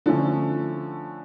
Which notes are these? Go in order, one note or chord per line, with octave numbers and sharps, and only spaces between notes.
D3 F3 A3 C#4